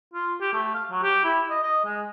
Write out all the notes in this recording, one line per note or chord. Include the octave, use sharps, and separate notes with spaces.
F4
G4
A3
F5
F#3
G4
E4
D#5
D#5
G#3